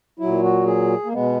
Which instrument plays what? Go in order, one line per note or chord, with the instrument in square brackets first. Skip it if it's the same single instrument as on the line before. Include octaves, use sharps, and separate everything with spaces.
[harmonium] A#2 F#3 E4
F#4
G#4
A#3
B2 G#3 B3